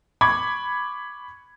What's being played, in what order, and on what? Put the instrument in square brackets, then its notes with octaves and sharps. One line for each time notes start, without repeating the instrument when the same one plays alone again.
[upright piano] B5 C#6 D6 G#6